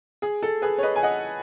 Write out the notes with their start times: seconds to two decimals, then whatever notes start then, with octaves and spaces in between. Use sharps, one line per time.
0.22 G#4
0.43 A4
0.62 G#4 B4
0.78 C#5
0.83 B4 D#5
0.96 G#5
1.03 D#5 F#5